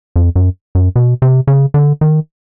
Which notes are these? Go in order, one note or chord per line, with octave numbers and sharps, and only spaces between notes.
F2
F#2
F#2
B2
C3
C#3
D3
D#3